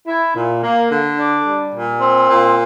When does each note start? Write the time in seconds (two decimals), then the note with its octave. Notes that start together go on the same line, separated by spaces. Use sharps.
0.08 E4
0.35 A#2
0.63 A#3
0.90 D3
1.18 D4
1.45 G3
1.73 A#2
2.00 C4
2.28 A#2